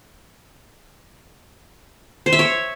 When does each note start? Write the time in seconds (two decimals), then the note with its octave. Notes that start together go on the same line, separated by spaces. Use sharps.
2.26 C5
2.33 E5
2.39 C#5